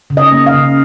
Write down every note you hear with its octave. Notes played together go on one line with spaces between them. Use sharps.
C#3
D#5
A#3
F5
C#3